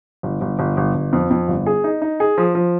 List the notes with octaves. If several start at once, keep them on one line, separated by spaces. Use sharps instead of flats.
G1
G1
G1
G1
G1
F2
F2
G1
G#4
D#4
D#4
G#4
F3
F3